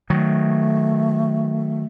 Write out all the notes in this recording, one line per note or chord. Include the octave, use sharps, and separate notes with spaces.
D#3 F#3 A3